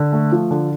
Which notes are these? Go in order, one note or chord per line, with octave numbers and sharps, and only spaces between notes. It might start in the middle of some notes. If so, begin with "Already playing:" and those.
Already playing: D3
A3
F3
D3